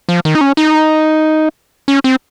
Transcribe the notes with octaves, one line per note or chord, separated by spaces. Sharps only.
F3
D#3
D#4
C#4
D#4
C#4
C4